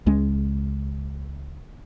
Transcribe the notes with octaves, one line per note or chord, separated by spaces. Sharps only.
C#2 G#3 C#4